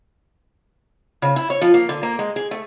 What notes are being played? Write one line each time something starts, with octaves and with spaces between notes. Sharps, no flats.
C#3
E4
C#5
F3
A#3
D3
A#3
G#3
G#4
A3